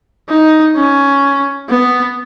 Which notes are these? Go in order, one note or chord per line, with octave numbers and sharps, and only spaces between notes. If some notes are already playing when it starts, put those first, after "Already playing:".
D#4
C#4
B3